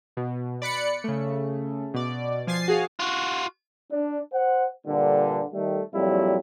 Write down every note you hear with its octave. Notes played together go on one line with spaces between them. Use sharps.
B2
D5 B5 F#6 C#7
C#3 A3
B2 D5
F3 G#5 A6 C7
F#4 G#4 F5
F4 F#4
D4
C5 F#5
G2 A#2 D3
D#3 G3 A3
F2 A#2 F#3 G3 E4